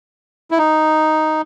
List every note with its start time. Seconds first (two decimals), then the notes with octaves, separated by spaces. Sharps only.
0.51 E4
0.58 D#4